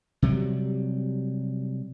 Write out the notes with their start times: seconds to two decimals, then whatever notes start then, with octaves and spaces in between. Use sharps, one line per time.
0.22 C3 F#3 G3